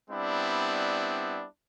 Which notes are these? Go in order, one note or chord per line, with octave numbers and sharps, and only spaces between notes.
G3 B3 C4 D4 E4